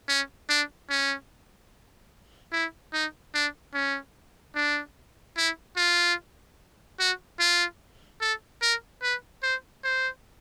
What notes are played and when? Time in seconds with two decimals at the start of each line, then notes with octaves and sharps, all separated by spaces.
0.08 C#4
0.49 D4
0.90 C#4
2.53 E4
2.93 D#4
3.34 D4
3.74 C#4
4.55 D4
5.37 E4
5.77 F4
6.99 F#4
7.39 F4
8.21 A4
8.62 A#4
9.02 B4
9.43 C5
9.84 C5